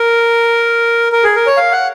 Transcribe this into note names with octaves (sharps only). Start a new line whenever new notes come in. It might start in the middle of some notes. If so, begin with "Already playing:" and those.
Already playing: A#4
A#4
G#4
A#4
C#5
F5
F#5